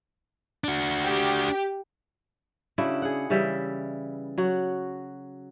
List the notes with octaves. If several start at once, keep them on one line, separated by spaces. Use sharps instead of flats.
D4 F#4
G4
C#3 D4 E4 F#4
G#4 F#5
C#3 E3 G3 E5
F#3 F#4